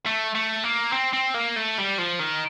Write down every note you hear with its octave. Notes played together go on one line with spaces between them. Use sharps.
A3
A3
A#3
C4
C4
A#3
A3
G3
F3
D#3